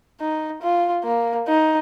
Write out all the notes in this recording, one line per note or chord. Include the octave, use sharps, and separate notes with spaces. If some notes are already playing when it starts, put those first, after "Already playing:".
D#4
F4
A#3
D#4